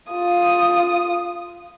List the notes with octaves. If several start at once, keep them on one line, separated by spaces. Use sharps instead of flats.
F4 D#6